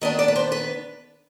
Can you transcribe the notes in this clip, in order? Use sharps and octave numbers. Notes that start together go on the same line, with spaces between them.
D#3 B3 D4 D#5
D5
B4
C5
B4